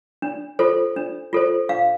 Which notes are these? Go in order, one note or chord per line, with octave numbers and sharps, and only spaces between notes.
D4
F4 A4 C5
D4
F4 A4 C5
D4 F5